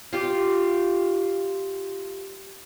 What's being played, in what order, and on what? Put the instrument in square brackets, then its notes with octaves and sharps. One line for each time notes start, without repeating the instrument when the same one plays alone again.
[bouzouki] F4 G4